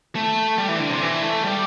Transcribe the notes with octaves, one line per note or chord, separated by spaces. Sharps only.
A3
G3
E3
D3
C3
E3
A3
G3